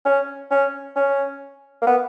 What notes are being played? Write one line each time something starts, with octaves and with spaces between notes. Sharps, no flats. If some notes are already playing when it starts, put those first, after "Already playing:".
C#4
C#4
C#4
A#3
B3